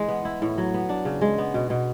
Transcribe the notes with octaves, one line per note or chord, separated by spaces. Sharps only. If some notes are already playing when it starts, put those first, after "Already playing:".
Already playing: E3 G#3
B3
E4
A2
F#3
B3
D4
C#3
G#3
B3
B2
B2